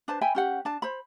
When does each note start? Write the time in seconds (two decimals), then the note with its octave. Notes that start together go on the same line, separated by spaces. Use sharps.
0.08 D4 B4 C5 A5
0.21 E5 G5 G#5 B5
0.35 C#4 G4 F#5
0.65 D4 A5
0.82 C5 B5